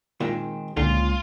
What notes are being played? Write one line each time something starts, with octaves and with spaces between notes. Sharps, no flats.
A#2 D#3 G#3 C4
C#2 A#2 D3 F4